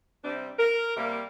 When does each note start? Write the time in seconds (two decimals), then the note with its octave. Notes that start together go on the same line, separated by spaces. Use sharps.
0.23 C3 G3 C4 D4
0.59 A#4
0.95 C3 G3 A#3